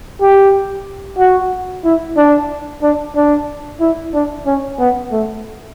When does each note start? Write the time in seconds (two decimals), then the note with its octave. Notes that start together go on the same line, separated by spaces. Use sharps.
0.21 G4
1.18 F#4
1.85 E4
2.17 D4
2.82 D4
3.16 D4
3.81 E4
4.14 D4
4.46 C#4
4.79 B3
5.12 A3